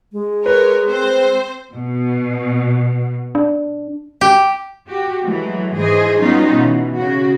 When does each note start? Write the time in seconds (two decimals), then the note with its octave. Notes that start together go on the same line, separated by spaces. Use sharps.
0.12 G#3
0.46 A#4 B4 C#5
0.87 C4 C5
1.74 B2
3.35 D4
4.21 G4
4.89 F#4 G4
5.24 E3 F#3 G#3 A3
5.77 G#2 E3 G#4 C5 D#5
6.20 F#3 G3 B3 C#4 D#4 F4
6.57 B2 E3
6.98 C#3 F#4